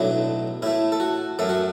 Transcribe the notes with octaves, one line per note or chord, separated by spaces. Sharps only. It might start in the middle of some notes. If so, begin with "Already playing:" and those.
Already playing: B1 A2 F#3 A3 D4
A2 A3 E4
A4
F#4
F#2 F#3 A3 A4
F#4